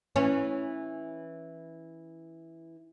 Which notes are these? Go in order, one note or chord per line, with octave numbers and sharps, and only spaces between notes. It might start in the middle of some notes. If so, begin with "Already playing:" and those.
E3 C#4